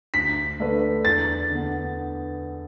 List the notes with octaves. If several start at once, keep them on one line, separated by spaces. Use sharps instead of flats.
D2 B6
D3 A3 D4 B4
E2 A6
D3 B3